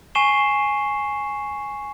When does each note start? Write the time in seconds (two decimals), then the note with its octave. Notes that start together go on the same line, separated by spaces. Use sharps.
0.15 G#5 C#6 C7 E7 G7